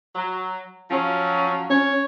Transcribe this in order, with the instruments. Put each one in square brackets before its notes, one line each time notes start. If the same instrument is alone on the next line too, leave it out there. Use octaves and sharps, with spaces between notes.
[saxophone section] F#3
[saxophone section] F3 F#3 [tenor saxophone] C#4
[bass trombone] C#4 [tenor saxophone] C#5